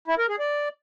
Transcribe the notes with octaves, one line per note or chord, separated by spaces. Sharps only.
E4
A#4
G#4
D5